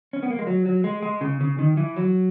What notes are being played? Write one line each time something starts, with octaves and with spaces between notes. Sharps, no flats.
C#4
B3
A#3
G#3
F#3
F#3
G#3
G#3
C#3
C#3
D#3
E3
F#3